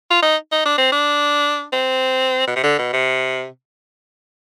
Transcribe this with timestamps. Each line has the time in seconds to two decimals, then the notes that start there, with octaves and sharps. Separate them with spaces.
0.11 F4
0.22 D#4
0.52 D#4
0.65 D4
0.78 C4
0.92 D4
1.73 C4
2.47 B2
2.56 C3
2.63 D3
2.78 B2
2.93 C3